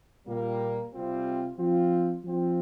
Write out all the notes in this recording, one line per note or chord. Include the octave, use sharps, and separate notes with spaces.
A#2 G3 A#3
C3 G3 C4 F4
F3 C4 F4
F3 C4 F4